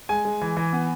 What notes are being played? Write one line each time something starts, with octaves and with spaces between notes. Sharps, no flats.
G#3 G#5
G#3
E3
E3
B3